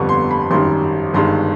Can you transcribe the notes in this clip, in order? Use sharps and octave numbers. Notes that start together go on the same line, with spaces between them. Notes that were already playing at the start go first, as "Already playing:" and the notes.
Already playing: G1 F2 D3 G3 B3 C#6
C6
B5
G#1 F#2 D#3 G3 C6
G1 G2 D#3 G#3 C6